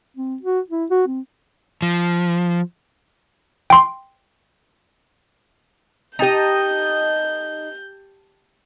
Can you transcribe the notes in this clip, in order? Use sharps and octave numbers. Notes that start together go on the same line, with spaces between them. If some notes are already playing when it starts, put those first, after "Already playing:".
C4
F#4
E4
F#4
C4
F3
G5 C6
D#4 G4 D#5 G5 A5 G6